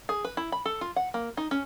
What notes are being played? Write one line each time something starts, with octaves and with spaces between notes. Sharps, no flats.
G#4
B4
E4
B5
A4
F4
F#5
A#3
D#4
C#4